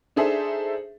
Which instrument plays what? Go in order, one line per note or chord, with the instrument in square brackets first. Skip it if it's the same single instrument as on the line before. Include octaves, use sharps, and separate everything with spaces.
[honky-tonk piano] D4 D#4 G#4 A4 C5 E5